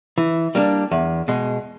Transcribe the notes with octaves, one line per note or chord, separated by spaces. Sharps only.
E3
G3 A#3 D4
E2
B2 G#3